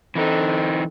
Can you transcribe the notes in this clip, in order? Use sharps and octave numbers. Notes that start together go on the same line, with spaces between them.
D3 E3 C4 D#4